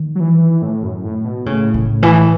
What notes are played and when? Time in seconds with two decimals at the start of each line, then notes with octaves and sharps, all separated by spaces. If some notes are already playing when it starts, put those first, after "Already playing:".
Already playing: D#3
0.15 F#3
0.20 E3
0.62 A2
0.83 F#2
1.04 A2
1.25 B2
1.46 A2 C#3
1.74 C#3
2.03 E3